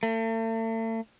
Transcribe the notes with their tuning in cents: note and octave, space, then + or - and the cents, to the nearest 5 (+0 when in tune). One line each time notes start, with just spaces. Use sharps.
A3 +40